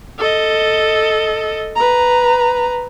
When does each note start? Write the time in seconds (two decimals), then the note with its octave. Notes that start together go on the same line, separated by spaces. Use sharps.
0.18 A4 D#5
1.76 B4 A#5